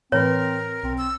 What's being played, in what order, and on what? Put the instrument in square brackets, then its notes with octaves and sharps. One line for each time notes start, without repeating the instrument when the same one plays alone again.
[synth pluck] A2 E3 B4 [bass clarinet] C4 [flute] A#4 [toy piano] C#5
[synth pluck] B1 [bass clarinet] C4
[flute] E6